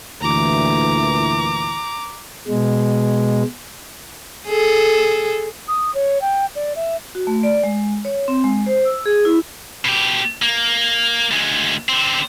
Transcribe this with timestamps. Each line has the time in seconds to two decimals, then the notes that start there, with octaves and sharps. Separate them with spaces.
0.21 D2 A#2 E3 A#5 D6
2.48 B2 G#3
4.48 G#4 A4
5.67 D#6
5.94 C#5
6.21 G5
6.55 D5
6.75 E5
7.15 F#4
7.27 A3
7.43 D5
7.64 G#3
8.05 C#5
8.28 C4
8.44 G#3
8.66 C5
8.85 E6
9.06 G#4
9.25 E4
9.85 B2 G4
10.42 A#3
11.31 D2 G#3
11.89 D3 C4